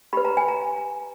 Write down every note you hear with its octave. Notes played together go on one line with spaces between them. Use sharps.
G4 B4 B5
A#5
G#5
A#5